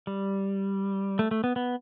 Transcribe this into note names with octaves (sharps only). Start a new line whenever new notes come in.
G3
A3
A3
B3
B3